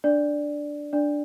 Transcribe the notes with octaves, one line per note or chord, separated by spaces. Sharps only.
D4 D5
D4 D5